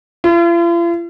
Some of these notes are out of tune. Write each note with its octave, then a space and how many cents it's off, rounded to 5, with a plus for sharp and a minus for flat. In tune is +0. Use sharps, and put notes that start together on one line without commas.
F4 -45